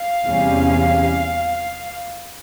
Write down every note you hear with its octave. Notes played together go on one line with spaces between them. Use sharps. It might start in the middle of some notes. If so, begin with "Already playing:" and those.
Already playing: F5
E2 C3 G3 C#4